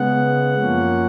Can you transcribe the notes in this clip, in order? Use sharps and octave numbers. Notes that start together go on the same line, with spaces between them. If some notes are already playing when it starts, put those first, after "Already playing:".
Already playing: C#3 G#3 B3 F#5
F#2 F3 A#3 C#4